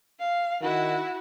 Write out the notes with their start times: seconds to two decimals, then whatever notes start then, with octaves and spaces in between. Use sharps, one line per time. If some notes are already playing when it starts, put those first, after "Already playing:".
0.19 F5
0.62 D#3 E4 F#4